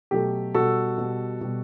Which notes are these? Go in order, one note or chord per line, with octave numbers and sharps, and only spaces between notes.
B2 F#3 A3 G4
B2 G3 F#4 A4
B2 G3
B2 G3